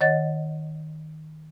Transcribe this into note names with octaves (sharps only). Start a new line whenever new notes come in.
D#3 C#5 D#5 F#5 A6